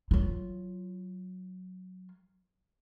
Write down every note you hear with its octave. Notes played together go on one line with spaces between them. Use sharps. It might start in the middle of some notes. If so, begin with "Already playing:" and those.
F#3 F4